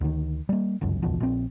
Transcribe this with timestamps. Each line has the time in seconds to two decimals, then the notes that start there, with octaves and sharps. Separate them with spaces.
0.01 D2 D#3
0.49 G3 A#3
0.81 G1 C#2 F#2
1.02 F#1 B1 E2 F3
1.20 A#1 C4